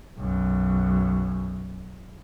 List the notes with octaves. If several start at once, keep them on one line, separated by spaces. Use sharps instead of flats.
B1 F#2